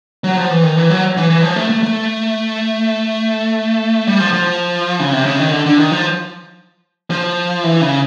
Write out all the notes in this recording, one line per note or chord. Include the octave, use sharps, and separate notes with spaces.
F#3
F3
E3
D#3
E3
F#3
E3
E3
F3
A3
A3
A3
G3
F3
F3
C#3
C3
C#3
D#3
D3
D3
D#3
F3
F3
E3
C#3